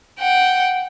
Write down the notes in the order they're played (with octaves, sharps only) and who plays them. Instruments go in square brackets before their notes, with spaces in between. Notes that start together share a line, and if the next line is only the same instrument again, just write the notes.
[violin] F#5 G5